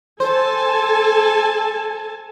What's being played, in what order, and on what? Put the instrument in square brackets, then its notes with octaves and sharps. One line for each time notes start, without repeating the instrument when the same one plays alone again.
[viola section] A4 G#5 A5 [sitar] C5